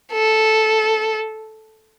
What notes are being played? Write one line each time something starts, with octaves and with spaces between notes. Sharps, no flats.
A4